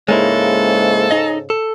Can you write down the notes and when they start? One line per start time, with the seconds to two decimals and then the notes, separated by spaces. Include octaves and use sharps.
0.09 G#2 C#3 G#3 A#3 E4 A4
1.11 D#4 D#5
1.50 A4